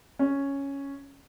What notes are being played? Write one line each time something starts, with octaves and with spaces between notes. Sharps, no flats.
C#4